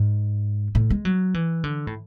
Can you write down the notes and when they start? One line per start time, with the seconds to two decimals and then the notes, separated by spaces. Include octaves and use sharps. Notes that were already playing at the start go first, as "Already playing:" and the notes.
Already playing: G#2
0.75 A2
0.90 G#3
1.05 F#3
1.34 E3
1.64 D3
1.87 A2